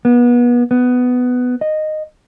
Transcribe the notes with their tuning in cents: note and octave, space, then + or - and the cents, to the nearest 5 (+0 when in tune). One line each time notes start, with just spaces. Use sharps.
B3 -30
B3 +10
D#5 -10